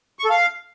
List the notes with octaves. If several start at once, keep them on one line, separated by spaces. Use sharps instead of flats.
C#6
A4
F5